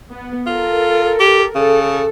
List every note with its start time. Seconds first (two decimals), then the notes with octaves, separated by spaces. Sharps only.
0.11 B3
0.46 F4 A4 A#4
1.20 G4
1.55 C#3 A4